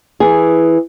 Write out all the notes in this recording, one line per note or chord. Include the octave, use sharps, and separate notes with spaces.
E3 G#4